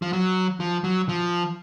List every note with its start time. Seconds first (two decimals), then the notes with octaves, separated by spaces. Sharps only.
0.02 F3
0.13 F#3
0.60 F3
0.84 F#3
1.09 F3